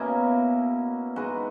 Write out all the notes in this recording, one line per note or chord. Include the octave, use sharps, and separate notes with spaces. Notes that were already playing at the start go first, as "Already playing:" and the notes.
Already playing: B2 A#3 C#4 E4
G#3 D#4 F#4 B4